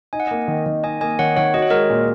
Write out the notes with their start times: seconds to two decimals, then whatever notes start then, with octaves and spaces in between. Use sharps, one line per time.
0.13 D#4 G#5
0.20 F#5
0.27 A#3 D#5 G#5
0.48 D#3
0.66 D#3
0.83 D#4 D#5 G#5
1.01 A#3 D#5 G#5
1.19 D#3 C#5 F#5
1.36 D#3 C#5 F#5
1.54 F#4 D#5
1.62 C#5
1.70 G#3 A#4 D#5
1.90 A#2